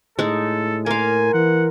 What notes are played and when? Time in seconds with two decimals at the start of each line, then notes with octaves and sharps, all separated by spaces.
0.19 A2 G#3 D#4 A4
0.86 A#3 A#4 F5 G#5 C6
1.34 E3 F#5